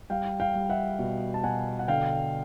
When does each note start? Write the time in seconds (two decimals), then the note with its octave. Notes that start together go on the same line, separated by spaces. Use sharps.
0.10 G3 F5 G5
0.40 F5 G5
0.55 G3
0.70 E5 F#5
0.99 B2
1.34 A5
1.44 B2 F#5 G#5
1.79 F#5
1.88 D3 F5 G5